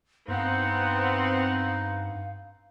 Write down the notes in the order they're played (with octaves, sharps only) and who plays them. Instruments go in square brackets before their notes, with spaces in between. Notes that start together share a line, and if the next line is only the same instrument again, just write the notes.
[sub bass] G2 [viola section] B3 C4 F#5 [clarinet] D#4 [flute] F5